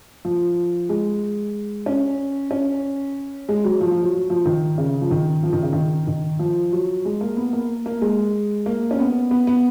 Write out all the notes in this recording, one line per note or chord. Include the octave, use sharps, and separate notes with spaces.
F3
G#3
C#4
C#4
G#3
F#3
F3
F3
F#3
F#3
F3
D#3
C#3
F3
D#3
F3
D#3
C#3
D#3
D#3
F3
F#3
G#3
A#3
B3
A#3
A#3
G#3
A#3
C#4
B3
B3
B3